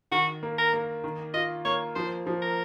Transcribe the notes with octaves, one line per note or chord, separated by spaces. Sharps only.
D#3 F#4
A#3
A#4
A#3
D#3
F4 D#5
A#3 C#5
F3 C5
F3
A#4